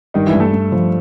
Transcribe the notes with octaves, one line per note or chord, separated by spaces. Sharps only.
G2 D#3 D#4
E3 E4
G2
A3 A4
G2
F3